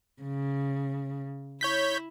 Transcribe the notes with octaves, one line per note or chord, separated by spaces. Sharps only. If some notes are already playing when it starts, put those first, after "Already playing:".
C#3
E4 C#5 G6 B6